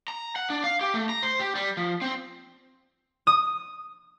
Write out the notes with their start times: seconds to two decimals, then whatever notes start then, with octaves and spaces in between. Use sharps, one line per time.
0.08 A#5
0.36 F#5
0.50 D4
0.64 F5
0.81 G4
0.94 A3
1.09 A#5
1.23 C5
1.40 G4
1.55 G3
1.77 F3
2.02 C4
3.27 D#6